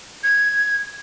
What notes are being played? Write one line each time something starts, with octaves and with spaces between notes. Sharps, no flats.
G#6